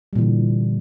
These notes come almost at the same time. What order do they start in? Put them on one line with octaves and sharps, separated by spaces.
G3 A#2 E3 D3